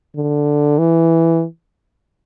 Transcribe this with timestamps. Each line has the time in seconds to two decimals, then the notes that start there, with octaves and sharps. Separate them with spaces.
0.16 D3
0.78 E3